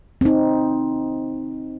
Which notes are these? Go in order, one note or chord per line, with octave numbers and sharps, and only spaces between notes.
C4 D#4